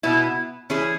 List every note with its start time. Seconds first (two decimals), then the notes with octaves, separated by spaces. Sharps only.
0.03 B2 B3 E4
0.70 E3 C#4 E4 G#4